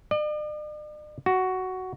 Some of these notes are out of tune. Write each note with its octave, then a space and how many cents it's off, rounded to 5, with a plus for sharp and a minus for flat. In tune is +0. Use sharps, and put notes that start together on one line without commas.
D5 +45
F#4 +10